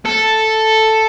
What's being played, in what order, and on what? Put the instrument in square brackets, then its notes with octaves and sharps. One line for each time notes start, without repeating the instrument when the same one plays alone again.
[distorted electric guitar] A4